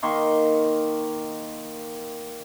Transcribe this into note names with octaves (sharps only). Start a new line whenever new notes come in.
D#3 A#3 C6 C#6